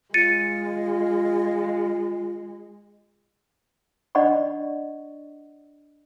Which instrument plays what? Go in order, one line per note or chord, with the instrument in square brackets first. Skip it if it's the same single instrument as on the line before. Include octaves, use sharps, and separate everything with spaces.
[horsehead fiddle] G#3 [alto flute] F4 [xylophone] A6 C#7 D#7
[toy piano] D4 D5 D#5 F#5 B5 C#6